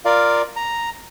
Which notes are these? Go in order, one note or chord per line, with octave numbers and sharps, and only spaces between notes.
F4 A#4 D5 F5
A#5